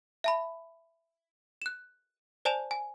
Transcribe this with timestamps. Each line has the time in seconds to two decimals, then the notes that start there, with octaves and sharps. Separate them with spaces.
0.24 E5 A5 B5
1.62 F#6 E7
2.45 C5 D5 G#5 A5 E7 F7
2.71 G#5